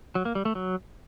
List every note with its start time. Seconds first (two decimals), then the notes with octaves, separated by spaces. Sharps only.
0.15 F#3
0.25 A#3
0.35 G3
0.45 A3
0.55 F#3